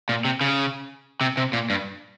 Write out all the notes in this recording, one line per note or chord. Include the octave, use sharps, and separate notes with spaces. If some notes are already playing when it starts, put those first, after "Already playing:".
A#2
C3
C#3
C3
C3
A#2
G2